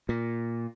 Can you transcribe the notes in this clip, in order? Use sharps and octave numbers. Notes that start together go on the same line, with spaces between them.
A#2